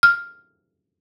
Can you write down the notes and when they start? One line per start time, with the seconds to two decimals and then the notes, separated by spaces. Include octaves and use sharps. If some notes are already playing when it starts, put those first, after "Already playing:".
0.03 F6